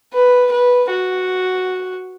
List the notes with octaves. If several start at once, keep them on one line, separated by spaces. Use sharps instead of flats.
B4
B4
F#4